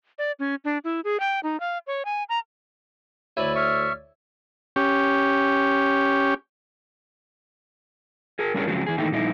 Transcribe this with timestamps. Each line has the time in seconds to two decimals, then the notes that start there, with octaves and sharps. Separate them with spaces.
0.18 D5
0.39 C#4
0.65 D4
0.84 E4
1.04 G#4
1.20 G5
1.43 D#4
1.60 F5
1.87 C#5
2.05 G#5
2.29 A#5
3.37 D2 E4 A4 C#5 D5 B5
3.56 E5 C#6 F6
4.76 C#4 G4
8.39 G#4 A#4
8.54 G3 C#4 D4 G#4 A#4 C#5
8.67 C#3 F3 F#3 G#3 C4
8.86 E3 G#4
8.98 D#3 E3 A3 A#3 D#4 G4
9.12 A#2 F3 G3 D#4 E4